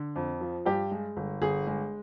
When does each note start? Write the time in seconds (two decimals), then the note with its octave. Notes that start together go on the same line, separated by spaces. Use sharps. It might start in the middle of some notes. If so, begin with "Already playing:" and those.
Already playing: D3
0.16 F2
0.41 F3
0.66 G2 G4
0.91 G#3
1.17 G1
1.42 G1 G#4
1.67 G#3